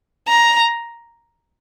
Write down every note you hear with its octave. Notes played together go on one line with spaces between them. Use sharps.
A#5